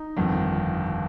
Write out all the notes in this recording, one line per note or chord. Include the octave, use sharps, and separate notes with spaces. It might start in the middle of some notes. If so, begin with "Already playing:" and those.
Already playing: D#4
G1 F2 D#3